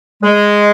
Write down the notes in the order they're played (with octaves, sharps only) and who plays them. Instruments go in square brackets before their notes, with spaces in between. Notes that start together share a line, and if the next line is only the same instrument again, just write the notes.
[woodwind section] G#3